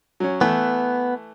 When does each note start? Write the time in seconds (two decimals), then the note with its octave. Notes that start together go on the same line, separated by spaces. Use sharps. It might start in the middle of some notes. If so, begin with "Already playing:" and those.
0.20 F#3 C#4
0.41 E3 A3 B3